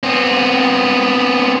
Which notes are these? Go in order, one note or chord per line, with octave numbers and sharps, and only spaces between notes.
B3 C4